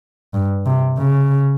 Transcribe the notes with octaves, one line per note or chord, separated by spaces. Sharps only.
G2
C3
C#3